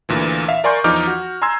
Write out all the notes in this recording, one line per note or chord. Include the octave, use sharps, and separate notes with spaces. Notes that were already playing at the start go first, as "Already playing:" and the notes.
D2 A#2 E3
E5 F5
A#4 D5 G#5 C6 C#6 G6
E2 F3 D#4 A#5 D6 F6
F#4
G#5 A#5 C6 E6 G#6